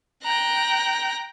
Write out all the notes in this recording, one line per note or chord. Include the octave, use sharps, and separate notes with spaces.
G5 A#5 F#6